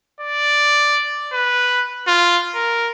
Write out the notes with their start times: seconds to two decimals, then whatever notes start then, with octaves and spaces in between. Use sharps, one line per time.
0.21 D5
1.33 B4
2.07 F4
2.55 A#4